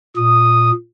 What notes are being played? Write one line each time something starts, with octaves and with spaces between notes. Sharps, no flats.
A#2 D#6